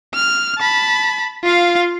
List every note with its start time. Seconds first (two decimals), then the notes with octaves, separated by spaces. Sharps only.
0.14 F6
0.58 A5 B5
1.44 F4 F5